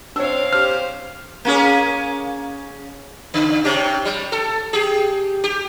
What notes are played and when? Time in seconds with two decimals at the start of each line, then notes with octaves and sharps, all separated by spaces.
0.16 C4 D4 C#5 F5 E6
0.53 G4 C5 F6
1.45 A#3 C#4 G#4
3.34 C#3
3.64 C3 C#4 G4
4.05 G3
4.32 A4
4.73 G4 G#4
5.44 G4